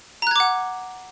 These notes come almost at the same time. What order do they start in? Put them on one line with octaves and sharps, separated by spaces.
A#5 F#6 G#6 D6 F#5